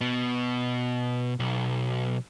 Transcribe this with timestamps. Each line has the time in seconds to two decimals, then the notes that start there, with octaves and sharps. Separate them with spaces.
0.01 B2
1.40 B1